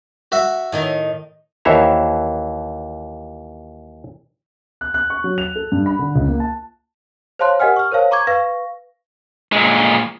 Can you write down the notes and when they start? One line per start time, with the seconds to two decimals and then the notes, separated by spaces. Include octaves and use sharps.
0.32 F#4 E5
0.72 A2 D#3 D#4
1.65 D#2 E3 C5 C#5 E5 A#5
4.81 F#6
4.94 F#6
5.10 C#6
5.24 F#3
5.38 F7
5.56 A4
5.72 G2
5.86 B5
5.99 D3
6.15 C#2
6.28 A#3
6.40 A5
7.39 C5 C#5 F5 A5 C6 F#6
7.60 G4 A#4 D#5 F#5 G#5 F6
7.76 C#6 F6
7.92 A#4 C5 C#5 F5 A5
8.11 A#5 C#6 D6 G#6
8.27 B4 F5 C#6 A#6
9.52 A#2 G#3